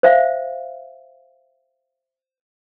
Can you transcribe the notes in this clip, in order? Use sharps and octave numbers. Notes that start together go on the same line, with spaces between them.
C5 E5 F5